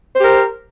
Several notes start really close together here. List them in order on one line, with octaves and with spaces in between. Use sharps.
C5 G4 A#4